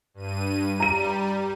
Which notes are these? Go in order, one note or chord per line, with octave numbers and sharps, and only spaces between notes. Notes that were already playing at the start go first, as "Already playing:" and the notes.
G2 D#7
G3 A#5 D#7